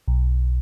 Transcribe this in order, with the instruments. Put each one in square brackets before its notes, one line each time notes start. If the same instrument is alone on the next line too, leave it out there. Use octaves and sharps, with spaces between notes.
[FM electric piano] B1